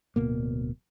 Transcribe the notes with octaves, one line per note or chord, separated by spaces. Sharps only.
D1 B2 A#3